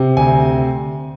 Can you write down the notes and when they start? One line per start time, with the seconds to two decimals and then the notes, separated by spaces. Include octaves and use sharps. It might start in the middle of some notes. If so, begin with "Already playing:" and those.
Already playing: C3
0.17 D2 G#5